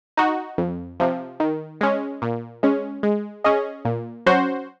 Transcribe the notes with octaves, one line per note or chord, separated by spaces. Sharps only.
D#4 F#4
F2
C3 F3
D#3
G#3 C#4
A#2
G#3 C#4
G#3
C#4 G#4 D#5
A#2
F#3 C#4 F#4 C5